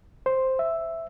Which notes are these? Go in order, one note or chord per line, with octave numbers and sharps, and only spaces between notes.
C5
E5